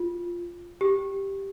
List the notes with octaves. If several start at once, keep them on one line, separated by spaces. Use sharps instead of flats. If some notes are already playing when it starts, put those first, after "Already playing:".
Already playing: F4
G4